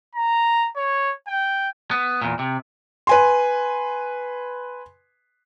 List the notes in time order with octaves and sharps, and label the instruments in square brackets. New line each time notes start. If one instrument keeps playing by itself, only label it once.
[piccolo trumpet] A#5
C#5
G5
[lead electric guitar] B3
E2 A#2
C3
[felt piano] B4 G#5 C6